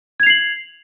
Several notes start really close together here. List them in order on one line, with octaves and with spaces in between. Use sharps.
G#6 F7 C7 F#7